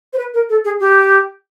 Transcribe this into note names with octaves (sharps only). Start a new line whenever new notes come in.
C5
B4
A#4
A4
G#4
G4